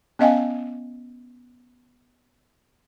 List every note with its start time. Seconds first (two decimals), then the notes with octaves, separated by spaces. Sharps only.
0.19 B3 C#4 D#5 F5 G5 G#5